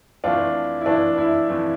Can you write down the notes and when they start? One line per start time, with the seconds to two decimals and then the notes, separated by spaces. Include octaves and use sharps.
0.24 F2 E3 A3 D4 F4
0.81 E4
0.86 F2 E3 A3 D4
1.18 E4
1.49 F2 E3 A3